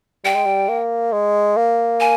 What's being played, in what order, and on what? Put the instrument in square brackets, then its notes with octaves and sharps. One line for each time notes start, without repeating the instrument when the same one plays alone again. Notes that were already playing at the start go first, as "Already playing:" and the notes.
[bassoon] G3 [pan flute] G5
[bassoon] G#3
G3
A#3
G#3
A#3
[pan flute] G#5